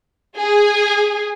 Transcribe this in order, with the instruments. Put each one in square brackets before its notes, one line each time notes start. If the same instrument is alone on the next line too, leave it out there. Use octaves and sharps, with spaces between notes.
[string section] G#4